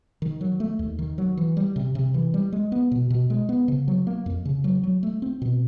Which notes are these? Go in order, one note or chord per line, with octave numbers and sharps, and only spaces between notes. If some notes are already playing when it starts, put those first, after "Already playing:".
D#3
F#3
A3
D#2
D#3
F#3
E3
G3
C3
C3
E3
G3
G#3
B3
B2
B2
G#3
B3
C#3
F#3
A#3
F2
C#3
F#3
F#3
A3
C4
B2